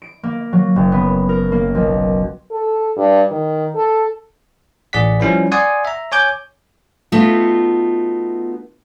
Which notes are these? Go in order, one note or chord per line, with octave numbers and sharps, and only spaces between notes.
D7
A#3
F#3
F#1
B3
A#4
A#3
B1
A4
G2
D#3
A4
A1 G#4 D5 F#5 B6
F3 G3 C#4 E4 B4
D5 F#5 G#5 C6 D#6
E5 A#5
C#5 G#5 D6 G6
A3 B3 D#4 F4 F#4